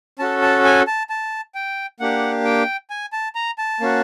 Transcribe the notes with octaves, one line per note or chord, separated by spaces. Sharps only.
C#4 F#4 A4 A5
A5
G#5
A5
A5
G5
A#3 D4 G4 F#5
G5
G#5
A5
A#5
A5
A#3 C#4 F#4